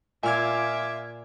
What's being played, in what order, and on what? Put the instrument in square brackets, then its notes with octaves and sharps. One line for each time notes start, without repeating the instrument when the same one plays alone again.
[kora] A#2 [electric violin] F4 D6 [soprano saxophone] E5 [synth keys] G#5 F6 G#6